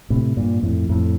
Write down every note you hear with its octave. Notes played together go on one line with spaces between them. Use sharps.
A2 C3
G2 A#2
F2 A2
F2 A2